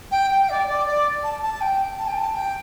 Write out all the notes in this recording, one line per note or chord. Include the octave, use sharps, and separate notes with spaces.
G5
G5
D5
D5
D5
A5
A5
G5
A5
G5
A5
G5